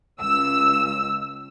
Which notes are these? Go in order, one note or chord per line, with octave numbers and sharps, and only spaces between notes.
C#2 E6